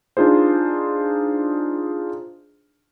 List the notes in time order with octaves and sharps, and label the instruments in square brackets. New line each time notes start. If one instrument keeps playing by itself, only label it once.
[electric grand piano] D4 D#4 F4 G#4 C5